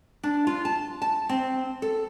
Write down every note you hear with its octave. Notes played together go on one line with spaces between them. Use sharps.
D4
F4
A5
A5
C4
A4